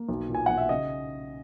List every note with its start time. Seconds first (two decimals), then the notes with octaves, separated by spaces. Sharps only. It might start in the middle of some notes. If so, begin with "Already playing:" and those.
Already playing: A#3
0.09 B1
0.29 A#2
0.35 G#5
0.46 B1 F#5
0.57 E5
0.69 C#3 D#5